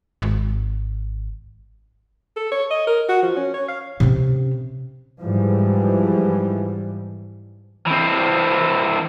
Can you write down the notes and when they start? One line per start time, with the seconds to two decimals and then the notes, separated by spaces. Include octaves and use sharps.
0.22 G#1
2.36 A4
2.52 C#5
2.71 D#5
2.87 A#4
3.09 F#4
3.23 F3
3.37 C#4
3.54 C#5
3.68 F5
4.00 C3 C#4
5.22 G#2 E3 F3 G3
7.87 E3 C4